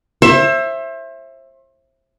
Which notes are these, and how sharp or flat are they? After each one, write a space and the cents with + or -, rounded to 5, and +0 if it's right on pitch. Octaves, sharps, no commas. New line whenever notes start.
C5 +35 E5 +10